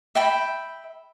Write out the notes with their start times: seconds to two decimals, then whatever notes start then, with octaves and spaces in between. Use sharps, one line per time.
0.15 E5 G5 B5